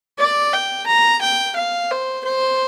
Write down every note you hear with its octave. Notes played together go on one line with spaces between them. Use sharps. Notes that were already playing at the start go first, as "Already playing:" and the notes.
D5
G5
A#5
G5
F5
C5
C5